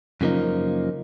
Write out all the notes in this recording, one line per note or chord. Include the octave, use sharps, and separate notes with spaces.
F#2 C#3 F3 A#3 D#4